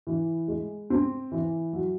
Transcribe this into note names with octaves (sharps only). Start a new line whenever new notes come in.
E3
G#3
C4
E3
F#3